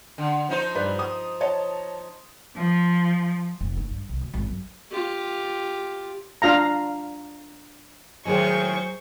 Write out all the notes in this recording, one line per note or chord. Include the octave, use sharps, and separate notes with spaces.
D3
F3 D#4 C5
G2 B4 D5
D#6
C#5 D#5 A5
F3
F1
D#4
G2
C2
D2
G#1
F#2
F4 G4
D4 F4 F5 A#5
A2 D#3 F#3 G#3 G#4 C5 C#6